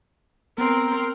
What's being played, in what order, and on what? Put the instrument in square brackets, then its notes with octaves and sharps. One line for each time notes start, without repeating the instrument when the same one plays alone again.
[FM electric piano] B3 [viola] C4 A#4